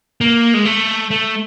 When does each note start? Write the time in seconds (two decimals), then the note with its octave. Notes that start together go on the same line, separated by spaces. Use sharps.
0.21 A#3
0.54 G#3
0.65 A3
1.11 A3